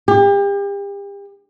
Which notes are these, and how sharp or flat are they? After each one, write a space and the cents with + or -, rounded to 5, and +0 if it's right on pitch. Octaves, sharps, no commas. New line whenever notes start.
G4 +35